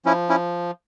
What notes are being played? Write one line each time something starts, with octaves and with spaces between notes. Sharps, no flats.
F3 C#4 E4
C#4 E4